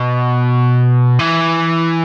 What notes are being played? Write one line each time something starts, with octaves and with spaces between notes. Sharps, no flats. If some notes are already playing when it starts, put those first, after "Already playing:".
Already playing: B2
E3